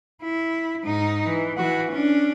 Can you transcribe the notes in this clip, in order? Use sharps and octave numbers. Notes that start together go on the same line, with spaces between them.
E4
G#2 D#4
E3
E3 F#4
C#4 D4